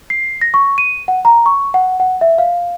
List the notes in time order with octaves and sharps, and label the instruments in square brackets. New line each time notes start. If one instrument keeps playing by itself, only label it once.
[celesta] C7
A#6
C#6
D#7
F#5
A#5
C#6
F#5
F#5
E5
F5